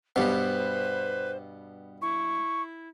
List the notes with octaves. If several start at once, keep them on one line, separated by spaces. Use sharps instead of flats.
G2 B2 B3 G4 B4 C5
E4 C#6